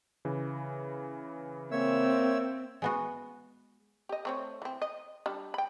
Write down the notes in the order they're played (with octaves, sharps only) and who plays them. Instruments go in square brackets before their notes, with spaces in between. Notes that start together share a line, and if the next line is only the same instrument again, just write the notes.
[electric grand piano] C#3 E3
[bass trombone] A#3 [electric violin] C4 [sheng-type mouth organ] C#5 E5 E6
[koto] G#3 B3 F#4
[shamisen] G4 D#5
A3 C4 C#5
E3 C4
D#5
G3 D4
G5 B5